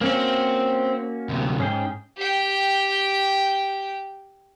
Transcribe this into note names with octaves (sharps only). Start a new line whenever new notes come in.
A#3 C4 C#4 F#4
D2 C3
G#2 C#4 G#4 G5
G4 G5